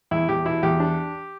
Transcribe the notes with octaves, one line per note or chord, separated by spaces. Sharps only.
E2 E4
E2 G4
B2 E4
E2 G4
D4